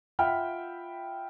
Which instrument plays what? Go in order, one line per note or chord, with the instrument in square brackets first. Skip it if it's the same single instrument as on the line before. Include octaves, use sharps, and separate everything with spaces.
[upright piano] F4 E5 F#5 G5 B5 F6